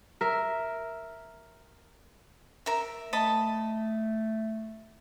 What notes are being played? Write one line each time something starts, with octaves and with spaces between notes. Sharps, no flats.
A#4 E5
A#4 E5
A3 D#5 A5 B5